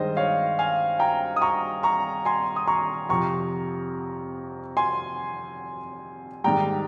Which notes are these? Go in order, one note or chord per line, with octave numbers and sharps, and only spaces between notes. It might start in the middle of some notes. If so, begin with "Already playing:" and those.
Already playing: G2 D#3 G#3 C5 D#5
C#5 F5
F5 G#5
G5 A#5
D#6
A#5 C#6
A#5 C#6
G#5 C6
D#6
A#5 C#6
F2 C3 F3 A#5 C#6
G#5 C6
G#2 D#3 G3 G5 A#5